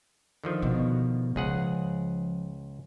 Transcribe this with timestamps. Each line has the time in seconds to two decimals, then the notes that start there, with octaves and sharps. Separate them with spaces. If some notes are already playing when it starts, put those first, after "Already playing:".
0.44 D3 D#3 F3
0.62 B2
1.36 C#2 F3 G#4 F#5